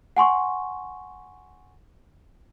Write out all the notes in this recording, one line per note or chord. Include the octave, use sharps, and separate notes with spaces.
F#5 G#5 C6 C#6